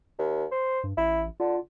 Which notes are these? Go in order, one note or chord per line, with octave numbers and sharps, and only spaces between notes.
D#2
C5
G2
A1 E4
D3 F4